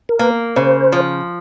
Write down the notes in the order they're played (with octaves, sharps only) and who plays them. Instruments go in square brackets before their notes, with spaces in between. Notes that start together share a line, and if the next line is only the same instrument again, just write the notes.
[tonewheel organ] A#4
[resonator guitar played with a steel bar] A#3 [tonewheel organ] B4
[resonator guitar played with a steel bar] C#3 [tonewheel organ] C5
[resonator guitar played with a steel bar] F3